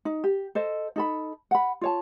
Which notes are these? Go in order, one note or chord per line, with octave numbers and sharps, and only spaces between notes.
D#4
G4
A4 C5 D#5
D#4 A4 B5
F#5 B5
F4 C#5 A5